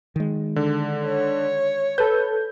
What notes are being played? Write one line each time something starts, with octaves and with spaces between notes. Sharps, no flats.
D#3 G#3
D3
C#5
A4 B4 G6